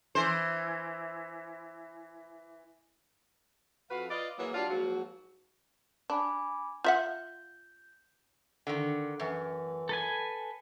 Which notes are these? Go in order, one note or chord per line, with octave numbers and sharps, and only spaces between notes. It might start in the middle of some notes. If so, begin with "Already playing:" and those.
E3 C5
F2 F#4 B4 F5
F4 B4 D5 D#5
E3 F#3 A#3 F#4 G#4 C#5
G3 D4 F4 F#4 D5 F5
G#2 F3 F#3 A#3 F#4
D4 G#5 B5 D6
F4 E5 F#5 G6
D3 D#3
F#2 E3
A4 B4 G#5